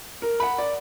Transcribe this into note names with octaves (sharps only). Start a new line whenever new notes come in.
A#4
F#5 B5
D5